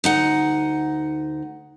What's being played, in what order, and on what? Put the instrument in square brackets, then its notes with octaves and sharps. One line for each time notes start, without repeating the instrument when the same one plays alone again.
[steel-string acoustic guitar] D2 D#4 F#5